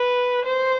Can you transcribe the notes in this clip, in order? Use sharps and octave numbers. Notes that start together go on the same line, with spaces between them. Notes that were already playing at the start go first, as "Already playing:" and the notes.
Already playing: B4
C5